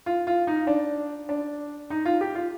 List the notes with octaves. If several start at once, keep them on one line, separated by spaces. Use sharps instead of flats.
F4
F4
D#4
D4
D4
D#4
F4
G4
F4